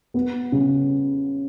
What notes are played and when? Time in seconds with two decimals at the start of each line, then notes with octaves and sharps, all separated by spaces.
0.14 B3
0.52 C#3